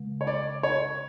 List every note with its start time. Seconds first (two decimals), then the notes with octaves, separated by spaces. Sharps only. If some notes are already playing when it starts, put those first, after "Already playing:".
Already playing: C#3 G#3
0.21 C#5
0.27 D5
0.63 C#5